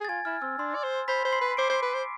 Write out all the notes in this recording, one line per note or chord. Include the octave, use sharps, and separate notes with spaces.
G#4
A6
F4 G#5 G#6
E4 F6
C4 E6
D4 C6
D5
C5
C5 B5 B6
C5
C6 C7
B4
C5 D6 D7
C5
B4
C5